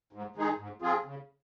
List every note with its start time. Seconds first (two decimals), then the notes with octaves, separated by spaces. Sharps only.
0.13 G#2
0.36 D#3 G#3 D#4 G#4
0.58 G#2
0.82 F3 C4 F4 G#4
1.05 C#3